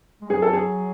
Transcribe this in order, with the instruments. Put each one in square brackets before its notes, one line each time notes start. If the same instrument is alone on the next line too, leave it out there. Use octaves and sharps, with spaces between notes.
[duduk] G#3
[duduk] F#3 [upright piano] G#4
[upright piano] A4
G#4